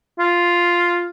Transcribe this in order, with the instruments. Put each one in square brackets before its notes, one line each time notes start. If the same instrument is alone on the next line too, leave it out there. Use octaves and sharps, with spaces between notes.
[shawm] F4